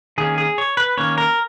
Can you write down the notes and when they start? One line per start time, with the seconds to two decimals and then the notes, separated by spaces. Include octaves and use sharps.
0.18 D#3 A#3 C#4 G#4
0.38 G#4
0.58 C#5
0.77 B4
0.97 D#3 A#3 C#4 C#5
1.18 A#4